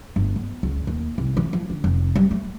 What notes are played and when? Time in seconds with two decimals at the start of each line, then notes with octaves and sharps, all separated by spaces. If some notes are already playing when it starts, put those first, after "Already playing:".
0.16 G1
0.36 B3
0.63 C#2
0.87 D#2
1.18 C2
1.37 E3
1.53 F3
1.70 D3
1.84 F1
2.16 G3
2.31 A3